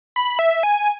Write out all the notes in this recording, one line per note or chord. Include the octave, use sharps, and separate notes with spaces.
B5
E5
G#5